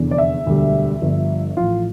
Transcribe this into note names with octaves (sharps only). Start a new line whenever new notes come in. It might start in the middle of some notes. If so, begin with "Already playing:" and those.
Already playing: F1 E2 D3
D5
E5
E1 D2 D3 G3
G1 G2 F3
A1 A2 F3 F4